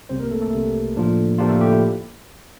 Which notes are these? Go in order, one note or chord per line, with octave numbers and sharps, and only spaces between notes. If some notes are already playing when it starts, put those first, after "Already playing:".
C2 C3 G3 C4 C5
A#3 A#4
A3 A4
A3 A4
C2 C3 G3
A2 F3 A#3 D4 F4
A2 F3 A#3 D4 F4 G4
A3 A4
G4
E4 E5